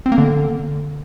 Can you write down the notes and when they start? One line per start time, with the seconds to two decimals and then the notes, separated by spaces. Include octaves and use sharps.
0.06 C4
0.12 A#3
0.18 D3